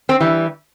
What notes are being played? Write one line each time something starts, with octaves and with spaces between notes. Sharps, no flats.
C4
E3 G3